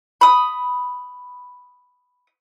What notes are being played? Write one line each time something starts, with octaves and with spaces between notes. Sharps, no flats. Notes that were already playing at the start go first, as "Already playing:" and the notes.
B5 D#6